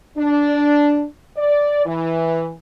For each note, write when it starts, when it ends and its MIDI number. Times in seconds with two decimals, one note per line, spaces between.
0.17 1.03 62
1.37 1.84 74
1.86 2.52 52